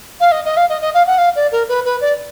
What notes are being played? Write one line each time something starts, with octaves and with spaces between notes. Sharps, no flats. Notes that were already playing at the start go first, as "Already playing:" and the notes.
F5
D#5
D#5
F5
D#5
D#5
F5
F#5
F5
D5
A#4
B4
B4
D5